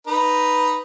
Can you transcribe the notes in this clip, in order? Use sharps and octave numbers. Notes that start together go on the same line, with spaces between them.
D#4 B4